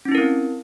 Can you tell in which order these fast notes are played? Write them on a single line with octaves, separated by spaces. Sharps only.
C#4 D#4 E4 A#4 C4